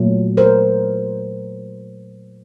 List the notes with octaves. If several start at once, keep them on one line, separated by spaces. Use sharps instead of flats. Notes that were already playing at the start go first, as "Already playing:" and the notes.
Already playing: A#2 F#3 A3
A#4 C5